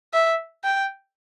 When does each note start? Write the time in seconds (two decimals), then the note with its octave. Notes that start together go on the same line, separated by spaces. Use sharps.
0.13 E5
0.64 G5